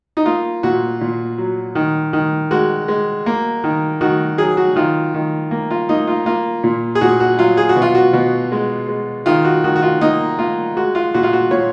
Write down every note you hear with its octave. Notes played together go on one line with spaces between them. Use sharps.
D#4
A#3 F4
A#2 F#4
A#2
F#3
D#3
D#3
G#3 F#4
G#3
A#3
D#3
D#3 F#4
F#3 G#4
F#4
D#3 F4
D#3
A#3
F4
A#3 D#4
F4
A#3 F4
A#2
G#4
A#2 F#4
F#4
F#3 F4
G#4
F#4
B2
F4
F#4
B2
G#3
G#3
D#3 F4
F#4
D#3 F#4
F#4
F4
A#3 D#4
A#3 F4
G#3 F#4
F4
A#2 F#4
F4
F#4
A#2 C#5